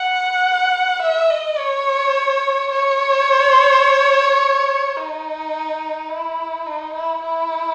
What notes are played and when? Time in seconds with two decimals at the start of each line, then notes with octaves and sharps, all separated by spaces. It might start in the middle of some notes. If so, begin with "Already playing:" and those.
Already playing: F#5
1.02 E5
1.30 D#5
1.58 C#5
2.72 C#5
4.97 D#4
6.09 E4
6.66 D#4
6.93 E4
7.22 E4